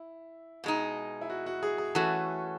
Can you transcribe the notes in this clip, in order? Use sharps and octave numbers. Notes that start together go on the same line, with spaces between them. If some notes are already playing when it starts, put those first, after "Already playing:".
Already playing: E4
B2 G#3 D#4
E4
F#4
F#4
G#4
G#4
E3 A3 C#4 F#4 A4